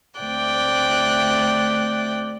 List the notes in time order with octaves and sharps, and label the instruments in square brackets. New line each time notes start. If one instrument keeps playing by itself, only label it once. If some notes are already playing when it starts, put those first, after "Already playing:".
[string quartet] D2 A3 C4 D5 G5 F#6